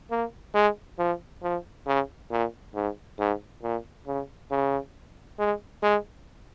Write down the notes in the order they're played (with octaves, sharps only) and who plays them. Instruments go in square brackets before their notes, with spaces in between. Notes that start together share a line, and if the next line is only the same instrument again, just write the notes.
[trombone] A#3
G#3
F3
F3
C#3
A#2
G#2
G#2
A#2
C#3
C#3
G#3
G#3